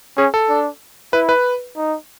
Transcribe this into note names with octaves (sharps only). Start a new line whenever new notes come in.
C#4 G#4
A4
D4
E4 B4
B4
D#4